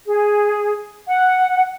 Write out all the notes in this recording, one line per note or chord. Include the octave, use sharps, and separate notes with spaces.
G#4
F#5